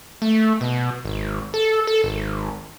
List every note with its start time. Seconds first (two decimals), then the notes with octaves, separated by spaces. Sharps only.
0.22 A3
0.61 B2
1.05 G#1
1.54 A4
1.87 A4
2.04 G#1